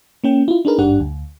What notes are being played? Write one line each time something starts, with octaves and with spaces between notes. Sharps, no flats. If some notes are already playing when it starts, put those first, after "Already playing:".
A#3 C#4 G5
E4 F4
D4 D#4 G#4 A#4 B4
G#1 G2 D4 G4 F#5
D2